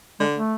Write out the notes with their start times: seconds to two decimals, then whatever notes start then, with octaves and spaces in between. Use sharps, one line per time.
0.20 D3 G#3
0.34 A3